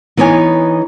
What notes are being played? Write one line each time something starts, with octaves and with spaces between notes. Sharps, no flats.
E3 B3 D#4 C#5 G#5